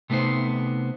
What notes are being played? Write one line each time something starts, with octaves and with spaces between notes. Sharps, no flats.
C3 A3 B3 D#4 C5